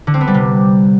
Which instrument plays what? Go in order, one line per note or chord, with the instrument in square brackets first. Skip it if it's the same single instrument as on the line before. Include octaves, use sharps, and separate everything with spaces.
[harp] D3
C4
B3
G3
C3